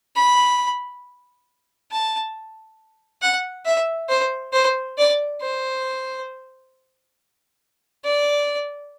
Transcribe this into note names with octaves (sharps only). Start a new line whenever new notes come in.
B5
A5
F#5
E5
C5
C5
D5
C5
D5